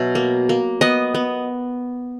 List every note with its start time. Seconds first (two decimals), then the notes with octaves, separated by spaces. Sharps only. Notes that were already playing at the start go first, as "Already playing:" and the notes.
Already playing: B2 F#3 E5
0.15 A#3
0.49 A#3
0.81 B3 D#5
1.15 B3